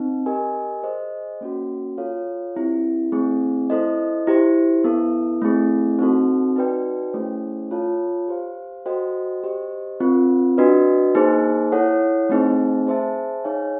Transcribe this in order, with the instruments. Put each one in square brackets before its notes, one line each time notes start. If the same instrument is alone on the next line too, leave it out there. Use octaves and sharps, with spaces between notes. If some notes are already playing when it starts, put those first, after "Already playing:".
Already playing: [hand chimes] C4 D#4
G4 A#4 D#5 G#5
G#4 C5 D#5
A#3 C#4 F#4
F4 A4 C#5 F5
C4 E4 G4
A3 C4 E4 G#4
E4 A4 C5 D#5
E4 G4 C5
B3 E4 A4
A3 C4 E4 G#4
C4 D#4 F#4 A4
D#4 F#4 B4 D5 G5
A3 C#4 E4 G#4 C5
F4 A4 C#5 F5 A5
G4 C5 F5
F#4 A4 C5 D#5 G5
G4 C5 D#5
C4 F4 A#4
D4 F#4 B4 D#5
A#3 D#4 G#4 C5
E4 A4 C#5 F#5
A3 C4 D#4 G#4 C5
G#4 C5 E5 A5
D#4 G#4 C#5 F5 G#5